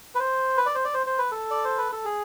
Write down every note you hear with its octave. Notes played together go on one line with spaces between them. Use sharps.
B4
C5
B4
D5
C5
D5
C5
C5
B4
A4
D5
C5
B4
A4
G#4